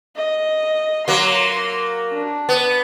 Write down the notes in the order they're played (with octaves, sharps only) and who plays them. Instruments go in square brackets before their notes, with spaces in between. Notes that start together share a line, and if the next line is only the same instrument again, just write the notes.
[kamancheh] D#5
[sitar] F#3 A#3 [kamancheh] C6
[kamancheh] D4
[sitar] B3